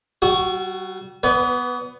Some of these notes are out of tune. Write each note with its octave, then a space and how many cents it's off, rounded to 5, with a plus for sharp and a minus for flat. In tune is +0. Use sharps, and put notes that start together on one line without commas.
G3 -35 F#4 +0 C#6 +0
B3 +0 B4 +20 D5 -45